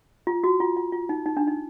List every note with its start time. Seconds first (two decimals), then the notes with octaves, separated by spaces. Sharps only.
0.27 F4
0.44 F#4
0.60 F4
0.76 F4
0.92 F4
1.09 D#4
1.26 D#4
1.37 D4
1.48 D#4